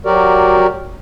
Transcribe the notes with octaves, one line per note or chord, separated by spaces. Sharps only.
F#3 F#4 G4 A#4 D5